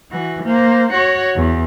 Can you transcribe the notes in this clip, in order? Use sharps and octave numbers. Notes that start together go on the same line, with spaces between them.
E3 F#4
A#3 C5
F#4 C#5
E2